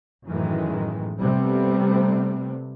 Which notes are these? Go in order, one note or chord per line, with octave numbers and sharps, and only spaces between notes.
F#2 A2 D#3 E3 G#3
C3 G3 A3 B3 C4